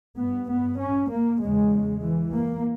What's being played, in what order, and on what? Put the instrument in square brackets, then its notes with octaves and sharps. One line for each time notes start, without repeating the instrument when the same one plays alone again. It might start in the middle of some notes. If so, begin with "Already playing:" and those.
[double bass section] G2 B3
B3
C#4
A#3
E2 C#3 G#3
E3
A#3